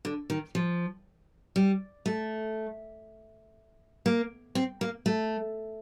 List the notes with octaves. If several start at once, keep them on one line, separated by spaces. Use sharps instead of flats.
D3
D#3
F3
G3
A3
A#3
C4
A#3
A3